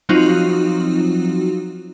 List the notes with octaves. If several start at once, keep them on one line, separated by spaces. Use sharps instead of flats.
F3 F#3 C4 D#4 F4 F#4